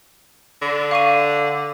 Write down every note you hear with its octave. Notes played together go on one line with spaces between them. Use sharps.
D3
F5 C#6 D#7